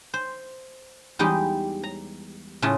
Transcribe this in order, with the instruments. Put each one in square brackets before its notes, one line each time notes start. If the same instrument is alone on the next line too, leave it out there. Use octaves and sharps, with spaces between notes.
[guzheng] C5
E2 G3 G#3 D#4 G4
A#5
A2 C#3 A3 F4